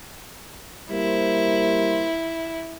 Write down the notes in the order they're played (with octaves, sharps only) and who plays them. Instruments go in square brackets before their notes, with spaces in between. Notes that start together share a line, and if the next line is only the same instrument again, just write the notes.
[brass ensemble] G3 A#3 C5 [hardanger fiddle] E4